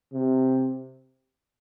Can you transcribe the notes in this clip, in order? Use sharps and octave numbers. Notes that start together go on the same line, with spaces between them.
C3